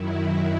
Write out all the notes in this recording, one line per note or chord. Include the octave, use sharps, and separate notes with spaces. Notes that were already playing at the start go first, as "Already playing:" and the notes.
Already playing: F#2 D#3 F#3 E4